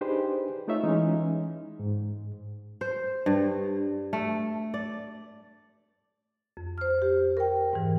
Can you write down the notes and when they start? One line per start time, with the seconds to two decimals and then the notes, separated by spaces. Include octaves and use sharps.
0.01 D4 D#4 G4 G#4 B4 C5
0.68 A3 D#4 F4 C#5 E5
0.83 E3 G#3 C#4 D#4
1.79 G#2
2.81 C5
3.26 G2
4.13 A3
4.74 D5
6.57 F2
6.78 C5 F6
7.02 G4
7.37 A#4 G5
7.73 G#2 E3